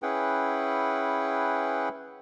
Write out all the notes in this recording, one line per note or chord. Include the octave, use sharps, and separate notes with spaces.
C#4 E4 G#4 B4 F#5 G5